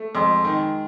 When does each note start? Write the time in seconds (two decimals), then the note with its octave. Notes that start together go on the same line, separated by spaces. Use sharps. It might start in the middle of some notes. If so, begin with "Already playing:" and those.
Already playing: A3
0.15 F2 G#3
0.44 D#3